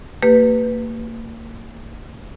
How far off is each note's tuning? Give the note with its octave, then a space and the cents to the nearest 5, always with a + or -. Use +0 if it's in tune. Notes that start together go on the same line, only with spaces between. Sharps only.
A#3 -35 G4 +0 B4 +0